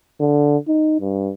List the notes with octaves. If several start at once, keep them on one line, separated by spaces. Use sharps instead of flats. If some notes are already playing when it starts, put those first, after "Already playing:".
D3
D#4
G2